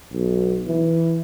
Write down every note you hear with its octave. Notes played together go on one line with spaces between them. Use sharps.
B1
E3